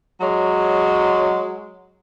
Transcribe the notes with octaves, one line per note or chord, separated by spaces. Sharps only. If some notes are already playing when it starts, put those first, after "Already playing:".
F#3 G#3 C#5